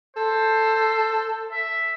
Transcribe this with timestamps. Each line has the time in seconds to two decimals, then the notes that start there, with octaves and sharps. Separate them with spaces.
0.17 A4 C5
1.52 E5